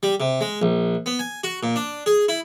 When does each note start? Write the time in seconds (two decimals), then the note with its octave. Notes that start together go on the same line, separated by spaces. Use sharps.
0.03 G3
0.20 C3
0.41 G#3
0.62 A#1
1.06 B3
1.19 G#5
1.44 F#4
1.63 A#2
1.76 D4
2.06 G#4
2.29 E4